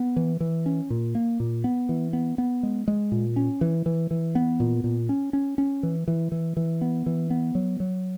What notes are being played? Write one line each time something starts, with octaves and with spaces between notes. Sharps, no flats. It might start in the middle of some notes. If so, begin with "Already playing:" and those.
Already playing: B3
E3
E3
C#4
A#2
A#3
A#2
B3
E3
B3
B3
G#3
G#3
A#2
C#4
E3
E3
E3
B3
A#2
A#2
C#4
C#4
C#4
E3
E3
E3
E3
B3
E3
B3
F#3
F#3